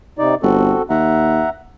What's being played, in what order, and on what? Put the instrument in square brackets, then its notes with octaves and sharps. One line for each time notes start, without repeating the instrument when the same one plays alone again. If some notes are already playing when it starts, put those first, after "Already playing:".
[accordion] C3 D#4 D5
[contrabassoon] G1 [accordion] C4 F#4 A4
[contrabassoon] D#2 [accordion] E5 F#5 A#5